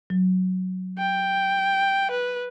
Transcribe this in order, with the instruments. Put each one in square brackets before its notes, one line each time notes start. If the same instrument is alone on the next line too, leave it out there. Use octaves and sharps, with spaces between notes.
[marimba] F#3
[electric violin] G5
B4